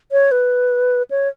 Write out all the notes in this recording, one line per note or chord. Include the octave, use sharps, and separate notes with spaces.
C#5
B4
C#5